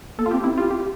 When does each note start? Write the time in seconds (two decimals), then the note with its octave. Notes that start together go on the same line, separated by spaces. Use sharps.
0.18 A#3 A4
0.26 F4
0.31 C4 G4
0.44 C4 E4
0.57 F4 G4
0.71 G4